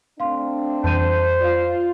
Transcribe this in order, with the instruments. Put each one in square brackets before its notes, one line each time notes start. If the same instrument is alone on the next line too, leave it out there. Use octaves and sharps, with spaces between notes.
[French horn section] A3 C4 D4 [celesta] F5 C6
[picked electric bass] F2 E3 G3 [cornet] C5 [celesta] A5 G6 D#7
[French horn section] F4 [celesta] D5 F5